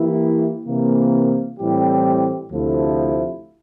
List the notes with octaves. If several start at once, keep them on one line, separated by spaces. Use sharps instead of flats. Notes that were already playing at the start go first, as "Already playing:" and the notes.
Already playing: E3 A#3 E4 G4
C3 E3 A#3
A2 E3 G3 C4 G4
D2 C3 F3 A3 E4